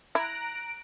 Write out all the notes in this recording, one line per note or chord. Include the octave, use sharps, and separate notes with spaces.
E4 A#5 F#6 A#6 D7